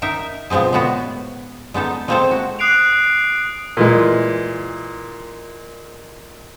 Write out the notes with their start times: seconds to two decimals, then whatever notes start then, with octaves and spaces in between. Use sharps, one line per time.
0.02 D#4 A#4 E5 A#5
0.50 B2 F3 G#3 C4 G#4
0.73 A2 G#3 B3 F#4 G#4
1.74 G#3 B3 D#4 A4
2.08 G#3 A#3 C4 G#4 A4 C5
2.31 F#4
2.59 D6 D#6 F#6 C7 D7 F7
3.77 A#2 E3 G#3